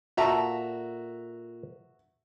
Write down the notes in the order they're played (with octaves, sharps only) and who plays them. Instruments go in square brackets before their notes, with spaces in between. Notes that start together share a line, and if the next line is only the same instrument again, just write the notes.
[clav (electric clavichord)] A#2 A4 A5 [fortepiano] F#4 E5 A#5